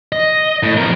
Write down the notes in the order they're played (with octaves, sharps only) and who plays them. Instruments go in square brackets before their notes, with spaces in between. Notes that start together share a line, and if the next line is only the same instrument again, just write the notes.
[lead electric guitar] D#5
A2
F2 A#4